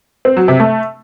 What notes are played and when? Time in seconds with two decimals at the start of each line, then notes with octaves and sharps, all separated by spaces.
0.25 C4
0.37 F#3
0.48 C3
0.60 A3